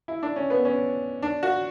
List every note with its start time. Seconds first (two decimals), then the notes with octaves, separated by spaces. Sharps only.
0.08 E4
0.23 D4
0.36 C#4
0.50 B3
0.65 C#4
1.22 D4
1.43 F#4